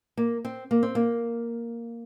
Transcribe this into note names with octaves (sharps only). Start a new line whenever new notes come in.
A#3
C4
A#3
C4
A#3